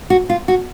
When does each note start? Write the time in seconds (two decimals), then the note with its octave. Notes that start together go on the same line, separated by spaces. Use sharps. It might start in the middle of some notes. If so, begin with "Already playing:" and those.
0.10 F#4
0.30 F4
0.48 F#4